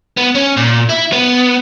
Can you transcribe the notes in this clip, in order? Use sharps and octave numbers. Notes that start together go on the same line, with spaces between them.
B3
C#4
A#2
E4
B3